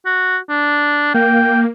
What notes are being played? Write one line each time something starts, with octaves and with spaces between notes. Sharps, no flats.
F#4
D4
A#3 G5